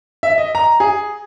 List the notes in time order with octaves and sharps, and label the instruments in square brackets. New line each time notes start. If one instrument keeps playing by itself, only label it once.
[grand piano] E5
D#5
A#5
G#4